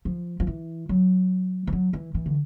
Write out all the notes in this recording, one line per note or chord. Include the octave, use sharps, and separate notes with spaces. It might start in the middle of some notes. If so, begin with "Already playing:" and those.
F3
F3
E3
F#3
F3
F#3
E3
E3
D3